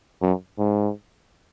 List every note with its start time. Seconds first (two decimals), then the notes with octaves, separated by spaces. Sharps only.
0.22 F#2
0.58 G#2